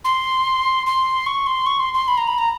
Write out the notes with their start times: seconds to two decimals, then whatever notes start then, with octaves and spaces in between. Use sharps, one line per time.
0.04 C6
0.86 C6
1.26 C#6
1.46 C6
1.66 C#6
1.80 C6
1.94 C6
2.08 B5
2.17 A#5
2.27 B5
2.38 A#5